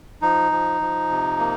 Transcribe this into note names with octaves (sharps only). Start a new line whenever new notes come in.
F3 D#4
F3
F3
C3
A#3